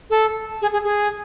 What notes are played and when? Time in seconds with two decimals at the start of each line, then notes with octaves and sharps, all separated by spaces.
0.10 A4
0.62 G#4
0.73 G#4
0.84 G#4